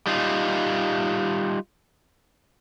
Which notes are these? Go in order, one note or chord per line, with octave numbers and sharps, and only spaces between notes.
G3 D#4 F4